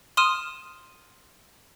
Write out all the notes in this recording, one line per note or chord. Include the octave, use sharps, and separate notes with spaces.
C6 D#6 F6 D#7 E7